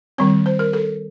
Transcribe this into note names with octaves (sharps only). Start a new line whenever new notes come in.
D#3 G3 C4 C#5
C5
A#4
A4